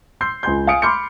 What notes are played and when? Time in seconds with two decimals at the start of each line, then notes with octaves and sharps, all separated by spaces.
0.21 C6 E6 G6 C7
0.43 C#2 G#5 C6 G6
0.67 F5 G#5 D#6 C#7 D7
0.82 B5 C6 D6 F6 G6 C#7